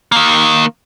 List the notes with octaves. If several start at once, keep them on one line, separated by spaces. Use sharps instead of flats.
D#3 A#3